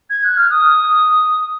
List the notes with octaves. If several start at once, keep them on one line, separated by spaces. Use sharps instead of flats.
G#6
F#6
F6
D#6